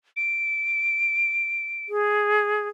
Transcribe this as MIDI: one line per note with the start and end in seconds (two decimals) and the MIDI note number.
0.17 1.88 98
1.89 2.68 68